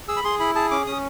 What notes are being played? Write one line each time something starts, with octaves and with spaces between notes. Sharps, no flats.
G#4 E6
B5
G#4 C6
E4 B5
G#4 A5
C#4 D6
C#4 D#6